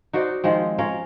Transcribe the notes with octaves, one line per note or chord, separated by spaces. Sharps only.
D#4 F#4 C5 D5
D#3 F3 G#3 C4
C#4 F4 A#4